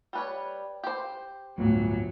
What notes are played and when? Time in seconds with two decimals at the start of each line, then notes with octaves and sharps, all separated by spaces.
0.13 G3 B4 C#5
0.84 G4 C5
1.58 G1 D2 A2 F#3